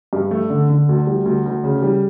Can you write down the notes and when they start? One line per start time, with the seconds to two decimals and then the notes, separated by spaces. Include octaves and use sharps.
0.13 G2
0.31 A3
0.50 D3
0.70 D3
0.89 D2
1.07 G3
1.26 D2
1.46 D2
1.64 C#3
1.82 G3